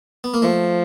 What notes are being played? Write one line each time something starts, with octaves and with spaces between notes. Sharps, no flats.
B3
A#3
F3 A3